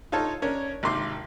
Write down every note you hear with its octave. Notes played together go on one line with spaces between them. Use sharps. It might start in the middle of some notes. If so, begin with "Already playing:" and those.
D#4 F4 A4 C#5 A5
C#4 D4 A#4 C#5
G#1 C3 D#3 C6 D6